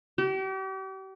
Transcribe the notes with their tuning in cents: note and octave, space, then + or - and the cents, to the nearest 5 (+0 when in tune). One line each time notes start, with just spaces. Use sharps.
G4 -40